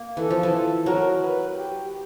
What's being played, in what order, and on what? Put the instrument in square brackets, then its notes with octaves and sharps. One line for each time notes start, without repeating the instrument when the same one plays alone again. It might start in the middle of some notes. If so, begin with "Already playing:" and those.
Already playing: [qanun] A#3
[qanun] E3 [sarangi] A4
[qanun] F3
E3
[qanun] F#3 [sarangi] A#4
[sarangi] B4
G4